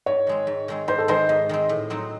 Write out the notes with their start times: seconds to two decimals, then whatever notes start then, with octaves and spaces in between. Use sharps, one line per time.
0.06 G#2 C#5
0.27 D#3 G#3 C4
0.47 G#2
0.68 D#3 G#3 C4
0.88 G#2 C5
0.99 A4
1.08 D#3 G#3 C4 C5
1.29 G#2 D#5
1.49 D#3 G#3 C4
1.69 A2
1.90 F#3 C4 D#4 F#4